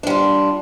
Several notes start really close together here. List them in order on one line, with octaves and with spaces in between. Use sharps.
D4 G3 F4